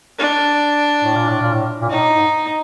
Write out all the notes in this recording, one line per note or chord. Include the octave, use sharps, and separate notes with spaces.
D4
A2
A#2
A2
A#2
A2
A#2
A2 D#4
G#2